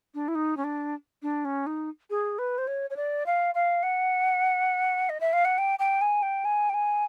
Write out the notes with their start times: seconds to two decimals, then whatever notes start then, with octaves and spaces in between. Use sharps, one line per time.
0.14 D4
0.28 E4
0.35 D#4
0.57 C#4
0.64 D4
1.22 D4
1.45 C#4
1.66 D#4
2.10 G#4
2.38 B4
2.58 C5
2.67 C#5
2.90 C#5
2.96 D5
3.26 F5
3.55 F5
3.83 F#5
5.09 D#5
5.20 E5
5.33 F5
5.45 F#5
5.58 G5
5.79 G5
6.01 G#5
6.22 G5
6.45 G#5
6.69 G5
6.74 G#5